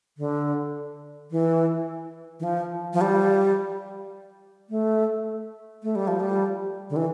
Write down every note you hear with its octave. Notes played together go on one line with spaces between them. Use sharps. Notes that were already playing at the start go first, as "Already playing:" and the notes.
D3
E3
E3
F3
F3
G3
A3
A3
G3
F3
G3
D3
E3